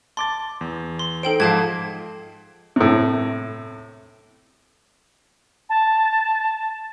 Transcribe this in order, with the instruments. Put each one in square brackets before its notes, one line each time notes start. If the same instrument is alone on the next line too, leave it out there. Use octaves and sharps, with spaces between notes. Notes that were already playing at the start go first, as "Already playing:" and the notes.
[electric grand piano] A5 D6 A6 [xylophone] C6
[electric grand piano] E2
[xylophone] C6
[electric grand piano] D#4 C5 [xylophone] A4 G5 D7
[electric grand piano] G#2 F3 [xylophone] F5 A5 G#6
[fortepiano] A2 C3
[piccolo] A5